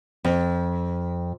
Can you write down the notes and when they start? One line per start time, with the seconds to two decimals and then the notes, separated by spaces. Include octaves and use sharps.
0.24 F2